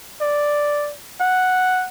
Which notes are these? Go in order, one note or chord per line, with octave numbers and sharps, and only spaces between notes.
D5
F#5